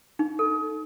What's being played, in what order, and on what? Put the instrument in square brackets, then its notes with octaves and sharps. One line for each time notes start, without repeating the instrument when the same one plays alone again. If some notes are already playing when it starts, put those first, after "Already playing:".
[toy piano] D#4
A4